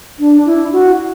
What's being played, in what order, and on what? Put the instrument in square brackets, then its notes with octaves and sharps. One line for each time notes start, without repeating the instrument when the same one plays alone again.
[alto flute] D4
E4
F#4